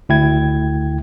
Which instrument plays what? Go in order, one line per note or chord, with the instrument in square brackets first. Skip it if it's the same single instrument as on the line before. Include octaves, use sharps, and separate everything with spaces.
[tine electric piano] D2 E4 G5 G#6